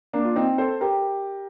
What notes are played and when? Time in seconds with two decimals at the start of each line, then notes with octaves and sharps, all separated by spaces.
0.13 A#3 D4
0.24 F4
0.36 C4 D#4
0.58 A4 C5
0.81 G4 A#4